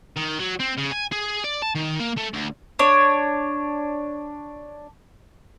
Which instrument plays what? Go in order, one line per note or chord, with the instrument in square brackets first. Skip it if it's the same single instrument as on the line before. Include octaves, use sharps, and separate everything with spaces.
[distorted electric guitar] D#3
F#3
C4
C#3
G#5
G#4
D5
A5
D#3
A#3
A3
D2
[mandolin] D4 C#5